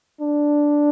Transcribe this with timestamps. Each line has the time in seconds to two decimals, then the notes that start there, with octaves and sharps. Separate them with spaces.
0.21 D4